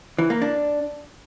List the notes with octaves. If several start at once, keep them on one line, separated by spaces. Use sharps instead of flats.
E3
A#3
D4